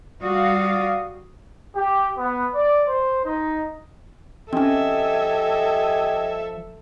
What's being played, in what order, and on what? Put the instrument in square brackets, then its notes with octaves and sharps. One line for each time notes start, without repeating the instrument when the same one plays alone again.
[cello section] G3 F#4 F5 [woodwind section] D5 D#6
[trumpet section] G4
B3
D5
C5
D#4
[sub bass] F3 [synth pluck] C4 C#4 [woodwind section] G4 D#5 G#5 [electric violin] A4 E5